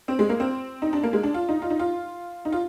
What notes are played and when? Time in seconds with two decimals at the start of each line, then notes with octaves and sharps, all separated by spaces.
0.08 C4
0.19 G#3
0.30 A#3
0.40 C4
0.82 D#4
0.93 D4
1.03 A#3
1.13 G#3
1.23 D4
1.34 F4
1.49 D#4
1.62 F4
1.70 D#4
1.79 F4
2.45 D#4
2.52 F4